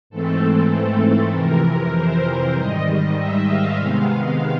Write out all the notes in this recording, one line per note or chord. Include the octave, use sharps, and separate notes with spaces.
G#2 E3 A3 C4 A4
F2 C3 E3 A#4
C5
G#2 D#3 G3 D#5
D#5
E5
F5
C3 D#3 G#3 B3